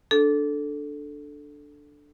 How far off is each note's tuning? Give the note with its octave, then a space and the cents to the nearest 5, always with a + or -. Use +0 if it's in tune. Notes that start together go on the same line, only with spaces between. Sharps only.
D4 +0 A4 -5